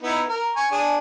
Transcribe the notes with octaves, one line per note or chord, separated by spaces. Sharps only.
B3 D#4 E4
A#4
G#5 C#6
D4 G#4